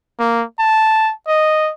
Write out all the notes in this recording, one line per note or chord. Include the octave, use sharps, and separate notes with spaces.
A#3
A5
D#5